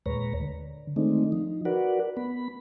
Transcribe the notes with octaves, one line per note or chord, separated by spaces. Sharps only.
D#2 A#2 G#3 B4 C#5 A#5
D3
D#3 G#3 A3 C4 D4 D#4
F3 D#4
F#4 A#4 B4 D5 F#5
B3 B5